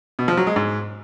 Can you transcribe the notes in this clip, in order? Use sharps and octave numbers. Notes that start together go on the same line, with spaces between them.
B2
F3
F#3
G#3
G#2